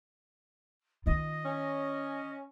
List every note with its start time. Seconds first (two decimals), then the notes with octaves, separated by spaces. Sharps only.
1.06 D#3 F4 D#5
1.44 C#4